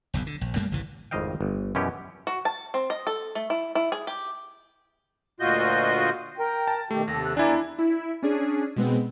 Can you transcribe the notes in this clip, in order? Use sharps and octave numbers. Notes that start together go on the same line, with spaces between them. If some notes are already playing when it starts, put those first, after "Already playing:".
F#1 B1 E2
D3
A#1
F#2 G3 A3 A#3
G#1 C#2 C3 E3
G#1 F2 A2 D#5 F5 G5
G1
F#2 B2 E3 C#4 G4
F#4
A5
C4
D#5
A4
A3
E4
E4
G#4
G4
D2 A#2 F4 F#4 D#5 G6
A#4 G5
A5
B2 D#3 A3 G4
D#2 C3 A4 A#6
F#6
E2 D4 E4 A#4 D5 G#5
E4
C#4 D4 G#4
B2 G#3 B3 C4